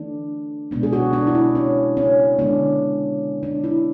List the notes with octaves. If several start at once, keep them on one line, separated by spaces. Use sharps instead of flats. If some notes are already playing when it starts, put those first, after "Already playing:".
Already playing: E3 A3 D4
B2 G#3 B3 D4
G#4
F#4
D4
E4
D4
C#4
C#4
D3 G#3 B3 D4
D4
E4